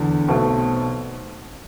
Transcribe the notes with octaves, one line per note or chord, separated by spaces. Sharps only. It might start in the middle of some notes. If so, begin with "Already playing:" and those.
Already playing: E2 D3
B1 B2 A3 C4